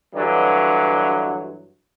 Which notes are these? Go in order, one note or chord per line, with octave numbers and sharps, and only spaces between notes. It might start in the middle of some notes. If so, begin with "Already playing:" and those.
G2 D3 E3 F#3